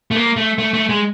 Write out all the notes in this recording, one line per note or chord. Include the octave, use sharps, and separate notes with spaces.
A3
A#3
A3
A3
A3
G#3